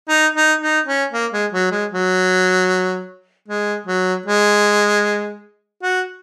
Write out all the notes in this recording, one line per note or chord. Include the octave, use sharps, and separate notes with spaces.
D#4
D#4
D#4
C#4
A#3
G#3
F#3
G#3
F#3
G#3
F#3
G#3
F#4